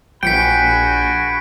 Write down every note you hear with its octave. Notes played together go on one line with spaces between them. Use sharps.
A#1 F#4 G5 G#5 B5 B6 C#7 D7